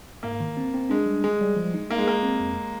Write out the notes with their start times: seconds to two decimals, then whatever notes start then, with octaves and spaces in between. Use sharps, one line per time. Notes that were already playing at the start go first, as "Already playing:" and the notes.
0.23 G#2 A#3
0.40 D#3
0.57 C4
0.74 C4
0.90 G#3 D4
1.06 G3
1.24 G#3 G#4
1.41 G3
1.56 F3
1.74 D#4
1.90 A#3 D#4
1.98 G#3
2.07 A#3 A#4
2.23 C4
2.40 F2